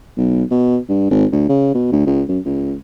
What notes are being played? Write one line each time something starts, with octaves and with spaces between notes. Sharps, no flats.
B1
B2
G2
G#1
D2
C#3
B2
D2
C#2
F#2
C#2